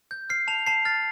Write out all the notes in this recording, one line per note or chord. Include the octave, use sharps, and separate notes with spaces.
G6
F6 C7
A5 F7
A5 C7
F6 A6